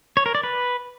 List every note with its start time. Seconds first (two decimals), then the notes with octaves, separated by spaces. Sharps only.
0.17 C#5
0.26 A#4
0.35 D5
0.43 B4